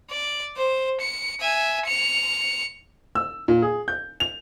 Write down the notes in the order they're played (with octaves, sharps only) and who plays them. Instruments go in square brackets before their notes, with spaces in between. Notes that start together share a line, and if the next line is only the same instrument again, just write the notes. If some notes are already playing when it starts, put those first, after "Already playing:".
[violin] D5
C5
C#7
E5 G#5
C#7 F7
[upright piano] E6
A#2
G#4
G6
F7